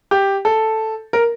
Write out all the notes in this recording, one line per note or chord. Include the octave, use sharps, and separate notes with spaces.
G4
A4
A#4